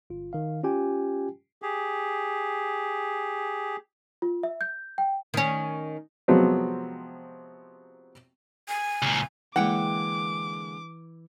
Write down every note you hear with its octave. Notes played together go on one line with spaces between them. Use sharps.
G1 F4
D#3 F5
C#4 F4 G4 G5 G#5
G4 G#4
F4
E5
G6
G5
D#3 C#4
C3 F3 F#3 G#3 B3 C4
G#5
C#2 A#2
D3 E3 G#3 A#3 F#5 G5 D6